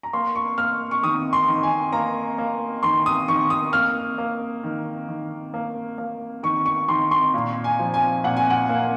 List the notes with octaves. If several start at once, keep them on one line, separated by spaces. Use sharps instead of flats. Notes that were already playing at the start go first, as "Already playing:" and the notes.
A#5
A#3 C6
C#6
A#3 F6
C#6
D#3 D#6
C6
D#3
G#5
A#3 A#5
A#3
D#3 C6
D#6
D#3 C#6
D#6
A#3 F6
A#3
D#3
D#3
A#3
A#3
D#3 C#6
C#6
D#3 C6
C6
A#2
G#5
F3
G#5
A#2 F#5
G#5
F#5
A#3